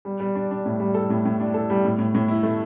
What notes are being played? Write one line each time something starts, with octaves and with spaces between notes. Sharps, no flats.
G3
G3
D4
D4
A2
G3
A4
A2
A2
D4
A4
G3
A2
A2
A2
E4
A3